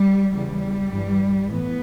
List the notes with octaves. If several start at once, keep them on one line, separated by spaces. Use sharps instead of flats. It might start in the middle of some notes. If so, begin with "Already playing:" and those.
Already playing: G3
E2 C#3 E3 G3
G2 E3
A2 E3 B3